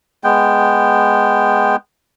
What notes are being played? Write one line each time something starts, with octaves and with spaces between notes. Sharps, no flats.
G#3 B3 G5